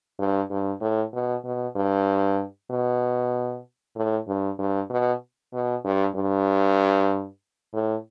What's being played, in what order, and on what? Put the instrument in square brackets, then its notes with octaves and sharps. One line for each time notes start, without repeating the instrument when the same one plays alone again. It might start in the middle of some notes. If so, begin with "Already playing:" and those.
[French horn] G2
G2
A2
B2
B2
G2
B2
A2
G2
G2
B2
B2
G2
G2
A2